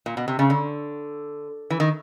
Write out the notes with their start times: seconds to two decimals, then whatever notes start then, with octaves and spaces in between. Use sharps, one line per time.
0.06 A#2
0.17 B2
0.28 C3
0.39 C#3
0.50 D3
1.70 E3
1.80 D#3